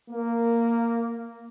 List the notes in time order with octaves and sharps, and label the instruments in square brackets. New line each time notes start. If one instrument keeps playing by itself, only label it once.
[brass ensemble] A#3